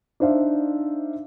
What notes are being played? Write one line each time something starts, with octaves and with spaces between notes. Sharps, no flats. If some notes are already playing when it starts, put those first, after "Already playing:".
D4 D#4 C5 D5 E5 F5